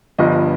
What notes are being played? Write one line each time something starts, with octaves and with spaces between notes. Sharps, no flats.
G1 G2 F3 D#5